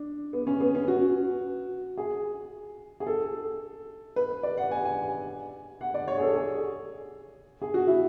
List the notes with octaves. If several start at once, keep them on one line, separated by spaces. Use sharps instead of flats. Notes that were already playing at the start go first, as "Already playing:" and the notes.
Already playing: D4
B3
C#4
B3
C#4
F#4
G#4
G#4
A4
B4
D5
F#5
G#5
G#5
F#5
D5
C#5
G#4
A4
G#4
G#4
F#4
E4